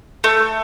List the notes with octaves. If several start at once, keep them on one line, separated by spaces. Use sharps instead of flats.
A3